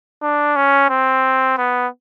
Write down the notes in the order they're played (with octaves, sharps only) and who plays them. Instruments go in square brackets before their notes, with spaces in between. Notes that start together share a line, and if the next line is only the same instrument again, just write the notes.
[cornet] D4
C#4
C4
B3